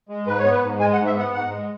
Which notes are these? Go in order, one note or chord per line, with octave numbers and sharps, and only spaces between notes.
G#3
G#2 B4
C#5
B3
B4
G#2
G#3 G#5
F#5
G#2
E5
B3 F#5
G#2 F#5
G#3